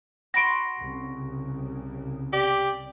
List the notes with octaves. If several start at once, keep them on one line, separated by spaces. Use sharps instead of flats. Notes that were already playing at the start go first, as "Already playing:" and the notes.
F#4 B5 C6 A#6 D7
C2 C#3
G4 D5